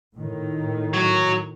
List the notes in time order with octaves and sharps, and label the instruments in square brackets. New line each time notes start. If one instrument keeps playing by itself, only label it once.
[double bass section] A2 D#3
[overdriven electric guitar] F#3 F#4